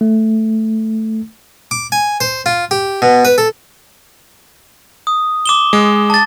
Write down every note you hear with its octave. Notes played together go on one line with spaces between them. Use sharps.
A3
D6
G#5
C5
F4
G4
B2
B4
A4
D#6
D6 E7 G7
G#3
A5 A6